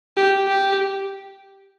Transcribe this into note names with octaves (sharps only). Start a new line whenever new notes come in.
G4
G4